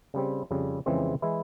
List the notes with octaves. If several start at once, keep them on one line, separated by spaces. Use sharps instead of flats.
C#3 G3 C4
F2 C#3 G3
F2 C#3 E3 G#3 C4
E3 G#3 E4